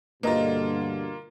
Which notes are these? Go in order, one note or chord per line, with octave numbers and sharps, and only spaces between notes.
G2 B2 D3 A#3 F4 B4 D#5 A#5